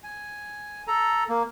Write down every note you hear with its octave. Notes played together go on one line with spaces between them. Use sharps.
G#5
A4 A#5
A#3